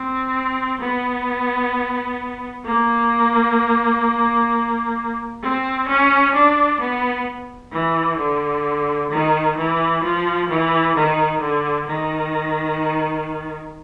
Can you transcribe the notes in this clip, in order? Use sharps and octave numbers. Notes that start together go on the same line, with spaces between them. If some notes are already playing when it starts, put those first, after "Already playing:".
Already playing: C4
B3
A#3
C4
C#4
D4
B3
E3
D3
D#3
E3
F3
E3
D#3
D3
D#3